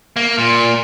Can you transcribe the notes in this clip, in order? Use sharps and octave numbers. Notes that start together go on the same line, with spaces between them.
A#3
A#2